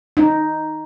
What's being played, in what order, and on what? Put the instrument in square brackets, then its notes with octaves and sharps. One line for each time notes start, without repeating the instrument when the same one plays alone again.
[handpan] D#4